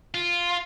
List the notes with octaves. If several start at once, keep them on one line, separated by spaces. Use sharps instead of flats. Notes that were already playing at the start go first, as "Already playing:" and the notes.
F4